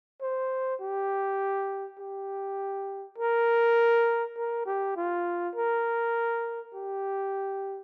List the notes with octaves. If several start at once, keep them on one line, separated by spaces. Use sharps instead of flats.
C5
G4
G4
A#4
A#4
G4
F4
A#4
G4